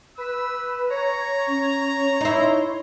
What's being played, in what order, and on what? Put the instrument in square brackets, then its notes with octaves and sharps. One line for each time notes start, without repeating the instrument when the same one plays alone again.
[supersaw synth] B4 [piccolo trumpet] E6
[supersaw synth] C#5 [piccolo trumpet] A#5
[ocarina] C#4
[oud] D#4 E4 [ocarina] C#5 [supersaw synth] C6